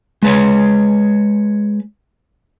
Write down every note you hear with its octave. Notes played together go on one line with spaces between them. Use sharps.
G#3 B4 C#5